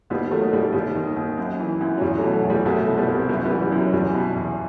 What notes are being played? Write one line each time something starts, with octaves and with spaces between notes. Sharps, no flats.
D#2 G3 B3
D#3 F#3 A3
D#2 G3
A3
D#2 G3
D#3
D#2
F#2
E3
F#2
F#3
E2 G3
F#3 A3
B2
F#3 A3
E2
G3 B3
C2 F#3 A3
B2
G3 B3
C2
C4
F#2 G3 B3
G3 B3
E3
G3
F#2 F#3
E2 G3
B2
E2